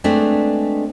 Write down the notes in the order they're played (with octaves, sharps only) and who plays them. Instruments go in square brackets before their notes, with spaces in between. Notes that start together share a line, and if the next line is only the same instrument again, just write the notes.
[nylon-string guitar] G#3 A3 C4 D4 B4